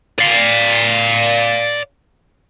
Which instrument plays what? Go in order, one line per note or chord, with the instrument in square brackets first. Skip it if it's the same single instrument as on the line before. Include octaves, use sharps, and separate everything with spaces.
[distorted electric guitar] D5 F5